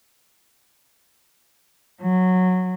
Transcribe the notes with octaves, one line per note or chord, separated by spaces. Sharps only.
F#3